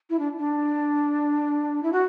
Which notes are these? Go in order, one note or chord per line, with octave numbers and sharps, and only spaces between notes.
E4
D4
D4
E4
F#4